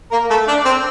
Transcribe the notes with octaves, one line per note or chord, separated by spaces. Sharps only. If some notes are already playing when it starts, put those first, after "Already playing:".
A#3 A#4
A3 A4
D4
C4